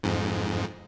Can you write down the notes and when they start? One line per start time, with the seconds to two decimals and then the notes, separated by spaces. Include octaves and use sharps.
0.03 F2 G#2